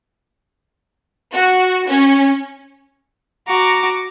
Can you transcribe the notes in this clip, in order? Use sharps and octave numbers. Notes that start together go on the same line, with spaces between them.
F#4
C#4
F#4 A#5 D6